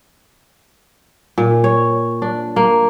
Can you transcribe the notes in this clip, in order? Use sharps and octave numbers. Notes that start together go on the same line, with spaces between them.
A#2
C#5
D4
A#3